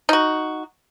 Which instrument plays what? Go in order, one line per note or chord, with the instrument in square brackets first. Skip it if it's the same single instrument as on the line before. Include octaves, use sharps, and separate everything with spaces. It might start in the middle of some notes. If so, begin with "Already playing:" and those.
[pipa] D#4 F#4